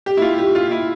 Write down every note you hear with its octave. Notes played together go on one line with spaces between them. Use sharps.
G4
E4
F4
G4
F4
E4